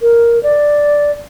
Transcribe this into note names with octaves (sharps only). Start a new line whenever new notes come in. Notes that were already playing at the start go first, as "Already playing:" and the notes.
A#4
D5